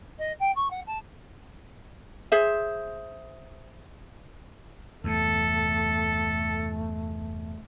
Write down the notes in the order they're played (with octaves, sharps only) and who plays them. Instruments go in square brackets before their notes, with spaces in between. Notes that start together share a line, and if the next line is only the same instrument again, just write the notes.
[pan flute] D#5
G5
C#6
F#5
A5
[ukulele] G#4 C5 E5
[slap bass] E2 G2 C3 [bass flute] A3 [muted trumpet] A4